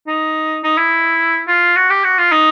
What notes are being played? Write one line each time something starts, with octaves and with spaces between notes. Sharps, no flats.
D#4
D#4
E4
F4
F#4
G4
F#4
F4
D#4